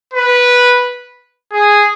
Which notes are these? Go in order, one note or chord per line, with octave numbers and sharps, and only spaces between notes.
B4
G#4